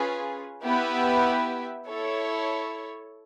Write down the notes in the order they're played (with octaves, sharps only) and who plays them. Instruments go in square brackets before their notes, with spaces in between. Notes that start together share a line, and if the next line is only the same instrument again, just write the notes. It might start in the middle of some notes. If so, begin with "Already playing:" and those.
Already playing: [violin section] C#4 F4 G#4 B4
B3 E4 G4 B4 E5
E4 A4 C#5